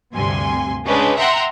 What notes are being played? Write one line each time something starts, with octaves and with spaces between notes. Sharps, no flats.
D2 G2 C3 G#5 C6
C#3 G#3 C#4 D4 B4
E5 F#5 G5 A#5 C6